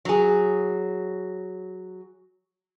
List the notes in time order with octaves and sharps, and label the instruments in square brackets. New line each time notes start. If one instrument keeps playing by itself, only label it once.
[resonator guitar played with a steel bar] F#3 G#4